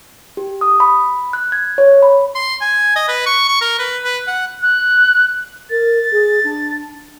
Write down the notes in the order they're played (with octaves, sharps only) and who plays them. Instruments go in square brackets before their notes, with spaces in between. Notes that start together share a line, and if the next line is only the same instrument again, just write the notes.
[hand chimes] G4
D#6
B5
F#6
G#6
C#5
B5
[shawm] C6
G#5
D#5
B4
C#6
C#6
A#4
B4
B4
F#5
[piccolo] F#6
[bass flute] A#4 [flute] A6
[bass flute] G#4
D4